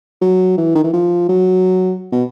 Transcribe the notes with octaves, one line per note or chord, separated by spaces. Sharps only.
F#3
E3
D#3
E3
F3
F#3
B2